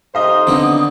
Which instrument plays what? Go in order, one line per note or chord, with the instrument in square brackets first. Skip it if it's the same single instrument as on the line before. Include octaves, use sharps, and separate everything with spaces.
[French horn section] F2 D#4 C5 [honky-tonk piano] G4 D#5 F5 [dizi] D#6
[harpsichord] D3 D#3 B3 [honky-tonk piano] C4